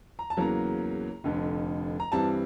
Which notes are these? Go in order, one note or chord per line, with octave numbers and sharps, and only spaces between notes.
A#5
A5
E2 C#3 F#3 A#3 A#5
F1 F2 D3
A#5
G2 E3 G3 C4 A5